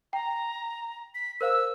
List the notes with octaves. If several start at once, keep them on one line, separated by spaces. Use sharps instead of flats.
G5 A#5
B6
A#4 C5 F5 E6